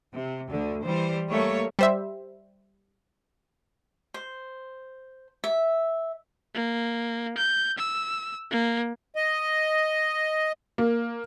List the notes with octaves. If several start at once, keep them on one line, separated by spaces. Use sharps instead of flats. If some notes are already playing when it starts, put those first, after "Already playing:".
C3
D2 D3
E3 G3 C5
G3 A3 A#3 C#5
G3 C5 E5
C5
E5
A#3
G6
E6
A#3
D#5
A#3